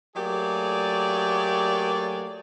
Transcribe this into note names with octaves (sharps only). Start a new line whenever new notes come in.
F#3 A3 A#3 G4 G#4 D5